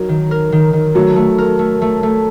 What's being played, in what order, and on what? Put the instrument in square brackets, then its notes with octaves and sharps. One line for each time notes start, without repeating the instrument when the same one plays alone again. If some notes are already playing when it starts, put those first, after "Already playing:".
Already playing: [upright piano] F#3 [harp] D#4 A#4
[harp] D#3
A#4
D#3
D#3
[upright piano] F#3 [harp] A3
[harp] A3
A#4
A3
A3
A3